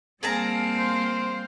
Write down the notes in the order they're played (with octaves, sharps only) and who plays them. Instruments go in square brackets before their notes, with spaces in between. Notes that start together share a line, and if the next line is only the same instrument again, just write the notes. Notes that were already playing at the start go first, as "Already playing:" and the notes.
[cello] G3 F5 [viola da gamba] A#3 C4 [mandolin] G#4 A5 A#5
[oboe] C5